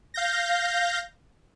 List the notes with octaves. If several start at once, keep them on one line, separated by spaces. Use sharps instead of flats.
F5 G6 A#6